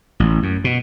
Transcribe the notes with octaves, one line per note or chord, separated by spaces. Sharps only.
A1
F#2
B2